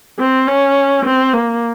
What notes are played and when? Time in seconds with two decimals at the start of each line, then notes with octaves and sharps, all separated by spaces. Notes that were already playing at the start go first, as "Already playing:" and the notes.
0.19 C4
0.47 C#4
1.05 C4
1.33 A#3